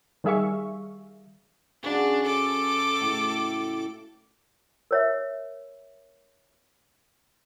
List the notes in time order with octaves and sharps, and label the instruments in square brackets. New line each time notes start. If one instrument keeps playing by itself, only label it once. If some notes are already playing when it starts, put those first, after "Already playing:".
[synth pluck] D#3 G3 G#4 E5 F5 C#6
[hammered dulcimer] C#3 F#4 [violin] D4
[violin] A4 D6
[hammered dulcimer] A2
[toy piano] A#4 C#5 E5